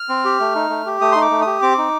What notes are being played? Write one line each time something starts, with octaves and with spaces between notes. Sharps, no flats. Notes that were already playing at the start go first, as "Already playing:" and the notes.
Already playing: F6
C4
G4
A3
D#4
A3
G4
A3 D#6
D#4 C6
D6
A3
G4 D#6
C4 D6
D#4